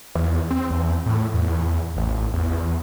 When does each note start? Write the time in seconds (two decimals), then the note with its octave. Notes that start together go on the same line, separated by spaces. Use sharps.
0.15 E2
0.51 C4
0.71 E2
1.06 A2
1.34 E2
1.97 A1
2.34 E2